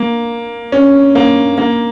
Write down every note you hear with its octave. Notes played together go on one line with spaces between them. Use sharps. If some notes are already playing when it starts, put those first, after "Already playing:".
Already playing: A#3
C#4
A#3
A#3